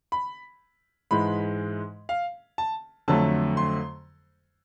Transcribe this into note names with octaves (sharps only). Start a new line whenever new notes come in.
B5
G#2 E3 G#3 B5
F5
A5
F2 D3 F#3 A3 A5
C6